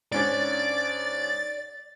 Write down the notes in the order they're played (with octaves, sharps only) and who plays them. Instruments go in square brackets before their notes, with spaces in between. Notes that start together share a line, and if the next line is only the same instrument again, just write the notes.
[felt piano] G#2 C#4 D4 [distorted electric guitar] D5 [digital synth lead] A6